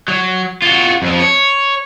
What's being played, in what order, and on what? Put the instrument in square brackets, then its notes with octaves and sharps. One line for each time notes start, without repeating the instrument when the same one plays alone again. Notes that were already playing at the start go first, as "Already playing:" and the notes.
[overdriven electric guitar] F#3
F4 F#4
F2 F3
C#5